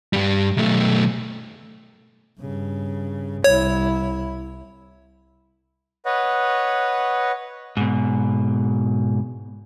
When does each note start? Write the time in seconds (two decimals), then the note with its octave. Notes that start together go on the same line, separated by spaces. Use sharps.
0.13 G2 G3
0.57 B1 A3
2.40 G2 C#3
3.44 C2 E4 C#5
6.05 B4 C#5 D#5 F#5
7.77 G#2 B2